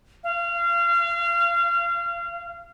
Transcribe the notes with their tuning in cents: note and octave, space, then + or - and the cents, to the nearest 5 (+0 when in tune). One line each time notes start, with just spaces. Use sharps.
F5 -30